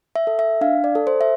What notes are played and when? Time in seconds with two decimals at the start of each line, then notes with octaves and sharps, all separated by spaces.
0.16 E5
0.27 A4
0.39 E5
0.61 D4 F5
0.84 D5
0.95 A4
1.07 C5
1.21 E5